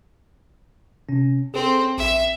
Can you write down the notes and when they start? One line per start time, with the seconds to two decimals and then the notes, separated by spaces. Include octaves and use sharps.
1.09 C3 C#4
1.54 C4 G#4 A4
1.98 A#1 E5